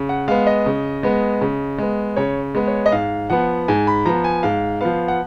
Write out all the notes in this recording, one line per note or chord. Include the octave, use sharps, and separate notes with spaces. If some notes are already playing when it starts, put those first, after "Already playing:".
Already playing: C#3
F#5
G#3 B3 F5
D#5
C#3
G#3 B3
C#3
G#3 B3
C#3 C#5
G#3 B3
C#5
D#5
G#2 F5
F3 B3 F#5
G#2 G#5
B5
F3 B3 A#5
G#5
G#2 F5
F3 B3 F5
F#5